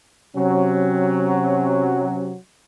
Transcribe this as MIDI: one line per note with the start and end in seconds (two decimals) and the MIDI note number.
0.36 2.37 48
0.36 2.37 54
0.36 2.32 61